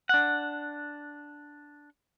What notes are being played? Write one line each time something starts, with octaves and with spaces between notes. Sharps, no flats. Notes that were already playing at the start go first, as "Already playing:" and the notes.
D4 F#5